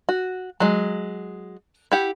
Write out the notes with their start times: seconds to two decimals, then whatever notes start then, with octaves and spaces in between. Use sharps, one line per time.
0.09 F#4
0.60 F#3 G#3
1.92 E4 G4 F#5